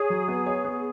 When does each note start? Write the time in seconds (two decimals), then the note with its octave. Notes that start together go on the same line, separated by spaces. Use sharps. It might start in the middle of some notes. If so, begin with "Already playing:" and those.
Already playing: G#4 C#5
0.10 F#3
0.28 B3
0.46 C#5
0.65 B3